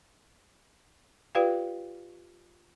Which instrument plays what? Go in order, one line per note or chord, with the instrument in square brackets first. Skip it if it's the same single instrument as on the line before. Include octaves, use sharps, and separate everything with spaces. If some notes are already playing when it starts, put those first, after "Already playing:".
[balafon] F4 G4 B4 D5 F5 G5